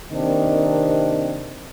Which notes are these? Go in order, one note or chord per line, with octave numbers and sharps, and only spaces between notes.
C3 D#3 A#3 C4 D4